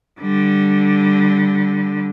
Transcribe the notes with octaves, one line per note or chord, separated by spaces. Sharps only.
D3 G3